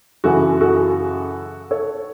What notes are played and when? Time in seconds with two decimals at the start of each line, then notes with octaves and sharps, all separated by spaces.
0.24 F#2 C#3 E3 F#4 A4
0.61 F#4 A4
1.71 A4 C#5